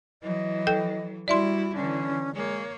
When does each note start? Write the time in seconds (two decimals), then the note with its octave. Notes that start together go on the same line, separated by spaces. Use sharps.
0.23 E3 F#3 D#5
0.67 A4 G5 G6
1.28 G3 E4 F#4 D5 E5 C6
1.75 D3 E3 C#4
2.35 G#3 A#3 C#5